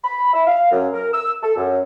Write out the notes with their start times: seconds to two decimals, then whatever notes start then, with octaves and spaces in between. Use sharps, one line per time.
0.04 B5
0.34 E5
0.46 F5
0.71 F#2
0.93 A#4
1.13 E6
1.42 A4
1.56 F#2